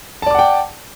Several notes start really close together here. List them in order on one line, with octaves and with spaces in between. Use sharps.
A5 D5 D6 F#5 G5